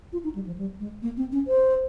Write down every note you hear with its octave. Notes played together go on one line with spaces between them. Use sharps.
F4
D#4
G3
F3
G3
G#3
A#3
C4
C#4
C5